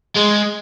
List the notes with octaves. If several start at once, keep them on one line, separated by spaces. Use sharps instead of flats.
G#3